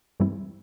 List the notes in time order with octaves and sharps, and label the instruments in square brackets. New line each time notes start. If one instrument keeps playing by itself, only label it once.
[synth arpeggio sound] G2 E3 G3 C4 E4